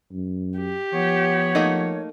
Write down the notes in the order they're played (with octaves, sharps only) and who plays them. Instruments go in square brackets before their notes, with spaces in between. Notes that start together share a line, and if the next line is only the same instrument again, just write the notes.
[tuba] F#2
[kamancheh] G4
[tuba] F3 [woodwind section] B3 C#5
[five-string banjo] A3 A#3 D#4